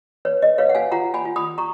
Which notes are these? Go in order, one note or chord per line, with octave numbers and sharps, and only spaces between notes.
B4 C#5
D#5
B4 C#5 F5
F#5
F5 G#5
F4 F#5 A#5
G#5 B5
F4
B5 D#6
A#5 C#6